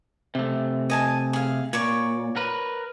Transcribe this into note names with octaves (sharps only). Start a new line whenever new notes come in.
C3 A3
D#5 G#5 A5
G#4 F5
A#2 C#5 D5 C#6
A#4 B4